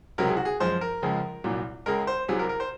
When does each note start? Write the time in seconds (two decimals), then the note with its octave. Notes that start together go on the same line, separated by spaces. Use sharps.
0.18 C#2 C3 F#3 A#4
0.28 G#4
0.37 F#4
0.45 G#4
0.60 F#2 F3 G#3 C5
0.81 A#4
1.02 C#2 C#3 F3 G#3
1.44 C2 A#2 F#3
1.86 C#2 C#3 G#3 A#4
2.07 C5
2.28 C2 C3 F#3 G#4
2.39 A#4
2.49 A#4
2.60 C5